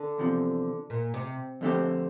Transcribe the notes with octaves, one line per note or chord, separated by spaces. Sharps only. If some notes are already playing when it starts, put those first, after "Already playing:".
Already playing: D3
E2 C3 F3
A#2
C3
F2 D3 A3 C4 G4